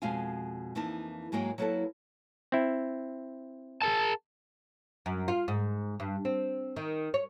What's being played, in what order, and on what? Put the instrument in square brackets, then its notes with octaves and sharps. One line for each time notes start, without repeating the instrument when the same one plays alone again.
[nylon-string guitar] F2 B2 G#3 F4 F5 G#5
F2 E3 A#3 D#4 A5
G#2 F#3 G#3 A#3 D#5 G5
F#3 A#3 E4 A4 B4 A5
[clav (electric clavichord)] C4 E4
[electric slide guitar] G#4 A#4 A5
[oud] F#2
F4
G#2
G2
C4
D#3
C#5